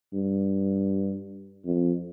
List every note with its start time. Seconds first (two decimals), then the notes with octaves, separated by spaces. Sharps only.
0.13 G2
1.65 F2